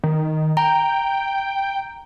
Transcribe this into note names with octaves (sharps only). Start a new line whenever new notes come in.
D#3
G5 A#5